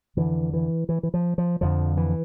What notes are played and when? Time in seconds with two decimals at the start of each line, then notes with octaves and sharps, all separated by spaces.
0.17 F2 D3 E3
0.54 E3
0.89 E3
1.03 E3
1.14 F3
1.38 F3
1.61 F2 D3 F3
1.97 E3